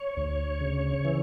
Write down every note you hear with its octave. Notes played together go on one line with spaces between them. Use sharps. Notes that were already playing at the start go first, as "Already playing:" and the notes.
Already playing: C#5
D2
C#3
E3